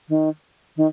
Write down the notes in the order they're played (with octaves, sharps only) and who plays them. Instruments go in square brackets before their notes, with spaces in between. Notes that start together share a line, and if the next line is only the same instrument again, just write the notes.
[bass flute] D#3
D#3